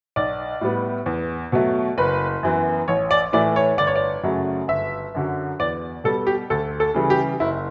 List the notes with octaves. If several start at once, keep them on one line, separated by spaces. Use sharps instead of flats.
B1 D5
A2 G3 B3
E2
B2 F#3 A3
F#1 B4
F#2 E3 B3
A1 C#5
D5
A2 E3 A3 D5
C#5
G1 D5
C#5
D5
F#2 C#3 F#3 A3
G1 E5
F#2 D3 F#3
E2 D5
B2 G3 A4
G4
D2 A4
A4
C#3 E3 G3
G4
F#1 E4